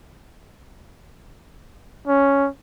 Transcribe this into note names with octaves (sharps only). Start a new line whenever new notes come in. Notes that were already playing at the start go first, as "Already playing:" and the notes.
C#4